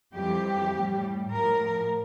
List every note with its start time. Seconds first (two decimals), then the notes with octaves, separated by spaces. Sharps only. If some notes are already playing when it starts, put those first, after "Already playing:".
0.15 F2 E3 G3 G4
0.74 A2 G3
1.33 A2 F3 A#4